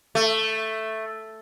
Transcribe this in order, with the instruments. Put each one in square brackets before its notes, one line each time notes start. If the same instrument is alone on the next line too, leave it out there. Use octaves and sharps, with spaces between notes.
[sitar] A3